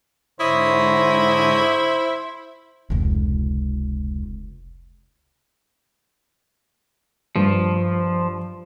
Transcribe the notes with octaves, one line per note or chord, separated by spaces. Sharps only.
G#2 D3 E4 C5 C#5 D#5 D#6
F1 C#2
G2 F3 G3